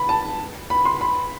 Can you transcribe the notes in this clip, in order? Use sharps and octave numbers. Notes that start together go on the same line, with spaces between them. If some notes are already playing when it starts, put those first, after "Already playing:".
Already playing: B5
A5
B5
C6
B5